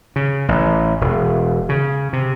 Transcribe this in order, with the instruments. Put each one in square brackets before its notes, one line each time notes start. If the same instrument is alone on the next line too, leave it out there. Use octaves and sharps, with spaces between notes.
[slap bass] C#3
A1
E1
C#3
C3